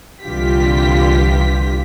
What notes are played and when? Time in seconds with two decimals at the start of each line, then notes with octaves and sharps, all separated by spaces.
0.22 C2 D3 E3 F4 G4 B6